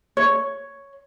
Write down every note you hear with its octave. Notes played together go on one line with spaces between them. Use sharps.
C#5